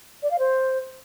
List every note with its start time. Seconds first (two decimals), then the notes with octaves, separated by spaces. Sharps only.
0.23 D5
0.31 F5
0.39 C5